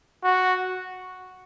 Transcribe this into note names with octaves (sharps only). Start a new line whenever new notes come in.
F#4